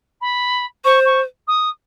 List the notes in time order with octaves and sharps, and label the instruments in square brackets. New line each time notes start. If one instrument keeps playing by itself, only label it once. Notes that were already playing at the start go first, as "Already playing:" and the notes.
[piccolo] B5
[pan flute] C5 [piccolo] C#6
[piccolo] C#6
D#6